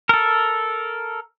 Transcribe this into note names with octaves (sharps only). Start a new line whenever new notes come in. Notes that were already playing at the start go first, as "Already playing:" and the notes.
A4 A#4